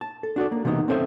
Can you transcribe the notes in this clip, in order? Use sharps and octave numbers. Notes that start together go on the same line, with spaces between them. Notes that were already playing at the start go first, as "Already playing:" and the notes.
A5
A4
D4 F#4 A4 D5
A#3
C3 E3 A#3 B3 D#4
C4 C#4 A4 C5 E5